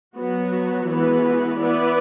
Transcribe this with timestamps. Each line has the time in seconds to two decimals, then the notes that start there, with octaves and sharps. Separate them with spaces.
0.15 F#3 B3 F#4
0.88 E3 G#3 B3 F#4 B4
1.60 B3 E4 B4 D5